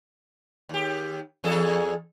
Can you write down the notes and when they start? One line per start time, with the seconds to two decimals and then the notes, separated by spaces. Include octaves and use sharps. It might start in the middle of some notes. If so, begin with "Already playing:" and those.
0.69 D#2 G4
1.44 E2 G#4 A4